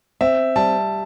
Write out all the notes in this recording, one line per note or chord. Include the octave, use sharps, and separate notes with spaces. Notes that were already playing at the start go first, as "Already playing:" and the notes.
C4 E5
G3 A5